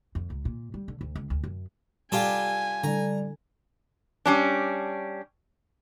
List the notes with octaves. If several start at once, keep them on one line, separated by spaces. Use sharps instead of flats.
F2
C#2
A#2
G3
D3
D2
C#2
D2
F#2
G3 F4 G4 A4 G#5
D3 G3 A#5
G3 C#4 D4